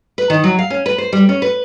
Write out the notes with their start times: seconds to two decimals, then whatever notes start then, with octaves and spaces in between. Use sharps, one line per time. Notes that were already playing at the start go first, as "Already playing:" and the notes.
0.18 B4
0.30 D#3
0.44 F#3
0.59 F5
0.70 C#4
0.86 B4
0.98 C5
1.13 G3
1.29 C#4
1.42 B4